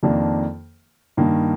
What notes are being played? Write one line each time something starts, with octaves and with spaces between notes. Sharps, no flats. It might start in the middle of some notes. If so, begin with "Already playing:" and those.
F2 D#3 A#3 D4
G2 D#3 A#3